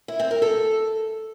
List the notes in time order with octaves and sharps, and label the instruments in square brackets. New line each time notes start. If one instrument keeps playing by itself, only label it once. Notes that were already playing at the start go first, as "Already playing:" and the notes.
[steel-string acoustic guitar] E4
C4
A#4
A4